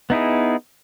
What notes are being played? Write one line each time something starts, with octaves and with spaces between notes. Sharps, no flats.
B3 D#4 E4 G#4